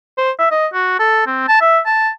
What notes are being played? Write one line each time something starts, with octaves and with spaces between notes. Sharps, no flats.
C5
E5
D#5
F#4
A4
C4
A5
E5
A5